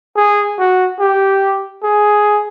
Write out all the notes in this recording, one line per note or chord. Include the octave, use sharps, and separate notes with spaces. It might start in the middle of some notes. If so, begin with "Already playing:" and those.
G#4
F#4
G4
G#4